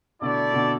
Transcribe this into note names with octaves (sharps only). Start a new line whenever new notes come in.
B2 D3 A3 E4 A4 D5
B2 D3